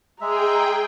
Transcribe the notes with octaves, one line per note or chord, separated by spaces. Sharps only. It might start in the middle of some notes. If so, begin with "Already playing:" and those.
G#3 G#4 E5 G5 A#5